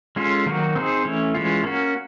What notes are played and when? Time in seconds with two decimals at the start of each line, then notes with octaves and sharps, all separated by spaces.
0.16 G#3 C#4 F4 A4
0.46 D#3 F#3 A#3 D#4 F#4
0.75 C4 D#4 G#4 C5
1.05 E3 A3 C#4
1.34 E3 G#3 C#4 F4
1.64 A#3 C#4 F#4